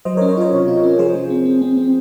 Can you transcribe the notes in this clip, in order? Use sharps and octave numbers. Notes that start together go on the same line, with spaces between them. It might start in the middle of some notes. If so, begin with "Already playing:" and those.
F#3 C5 D#5
C#4 A#4 C#5
C5 D#5
F4 A#4 C#5
C3
F4
C#4
F3 G#4 C5
F3
C4
C4
C4
C4